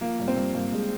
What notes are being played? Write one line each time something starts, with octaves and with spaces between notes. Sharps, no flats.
F3 A#3
G2
C4
G2
G2 A#3
G2 G#3